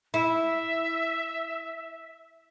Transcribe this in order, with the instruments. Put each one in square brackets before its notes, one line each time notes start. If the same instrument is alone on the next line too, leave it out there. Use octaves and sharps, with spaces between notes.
[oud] E4 [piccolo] E5